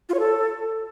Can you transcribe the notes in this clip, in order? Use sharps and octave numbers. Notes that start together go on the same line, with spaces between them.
F4
C#5
A4